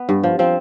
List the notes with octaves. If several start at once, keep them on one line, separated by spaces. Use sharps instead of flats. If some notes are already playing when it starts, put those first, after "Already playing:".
Already playing: B3
G2
F3
F3 C4